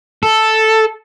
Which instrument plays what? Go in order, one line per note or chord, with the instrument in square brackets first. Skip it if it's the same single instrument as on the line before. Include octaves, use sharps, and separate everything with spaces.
[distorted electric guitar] A4